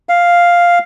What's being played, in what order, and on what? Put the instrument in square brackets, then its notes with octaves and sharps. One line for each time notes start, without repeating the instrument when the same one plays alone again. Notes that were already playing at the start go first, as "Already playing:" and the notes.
[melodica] F5